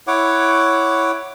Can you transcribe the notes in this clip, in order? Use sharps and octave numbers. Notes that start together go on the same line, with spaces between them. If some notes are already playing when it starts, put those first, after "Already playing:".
E4 C#5 F#5 D6